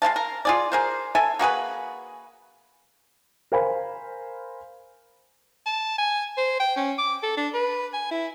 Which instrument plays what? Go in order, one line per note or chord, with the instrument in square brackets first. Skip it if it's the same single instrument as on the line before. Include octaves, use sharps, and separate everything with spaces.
[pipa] G#3 E4 F5 A5
A#4
F4 G#4 D5
G#4 A#4 C5
A4 E5 G#5
A#3 F#4 G#4 B4
[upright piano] A#4 C5 F5 G#5 B5
[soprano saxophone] A5
G#5
C5
G5
C#4
D6
A4
D4
B4
G#5
E4